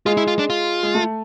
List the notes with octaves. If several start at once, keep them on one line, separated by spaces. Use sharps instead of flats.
G#3 F4
E4
F4
D4
F4
G#3
A3